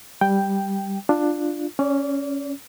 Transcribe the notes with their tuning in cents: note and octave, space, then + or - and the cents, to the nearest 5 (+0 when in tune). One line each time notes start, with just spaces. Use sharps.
G3 +0 G5 +0
D4 +10 F4 +0
C#4 +0 D5 -35